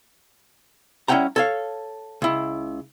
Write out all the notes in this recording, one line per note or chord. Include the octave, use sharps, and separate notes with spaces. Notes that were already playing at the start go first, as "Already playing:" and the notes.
G3 C#4 E4 F#5 G5 A#5
A4 C#5 F5
C#2 E4